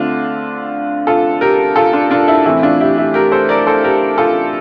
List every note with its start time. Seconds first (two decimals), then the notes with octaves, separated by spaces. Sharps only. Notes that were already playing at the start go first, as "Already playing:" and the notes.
Already playing: D3 A3 C4 D4 F4
1.07 F4 A4
1.41 G4 A#4
1.76 F4 A4
1.93 D4 F4
2.11 D4 F4
2.28 E4
2.46 A2 E3 A3 C4 E4
2.63 D4 F4
2.80 E4 G4
2.97 E4 G4
3.14 G4 A#4
3.32 A4 C5
3.49 A#4 D5
3.67 A4 C5
3.84 G4 A#4
4.18 F4 A4